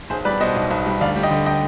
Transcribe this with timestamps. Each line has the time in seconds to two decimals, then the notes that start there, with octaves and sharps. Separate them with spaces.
0.10 B1 G#4 C5
0.25 G3 B4 D5
0.40 B2 C5 D#5
0.56 B1
0.71 B1
0.86 G3
1.01 D2 D5 F5
1.16 G3
1.23 D#5 G5
1.31 D3
1.46 D#5 G5